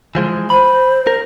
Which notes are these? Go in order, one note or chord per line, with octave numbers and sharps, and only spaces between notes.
E3 F3 G#3
C5 B5
A#4